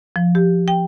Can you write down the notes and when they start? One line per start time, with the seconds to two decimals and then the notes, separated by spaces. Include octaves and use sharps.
0.16 F3
0.35 G4
0.68 G5